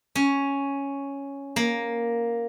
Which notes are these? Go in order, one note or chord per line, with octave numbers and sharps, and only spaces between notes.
C#4
A#3